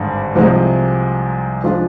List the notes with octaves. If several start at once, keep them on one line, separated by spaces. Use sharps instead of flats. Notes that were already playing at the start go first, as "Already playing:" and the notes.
Already playing: G#1 G2 D3 G#3
C2 C3 F3 G#3
F3 G#3 D4 F4